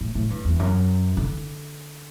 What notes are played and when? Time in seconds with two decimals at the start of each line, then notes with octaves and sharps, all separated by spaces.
0.01 A2
0.15 A2
0.30 G2
0.45 E2
0.59 F#2
1.17 D3